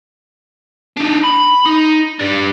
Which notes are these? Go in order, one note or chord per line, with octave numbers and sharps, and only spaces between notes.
D4 D#4
B5
D#4
G3 D4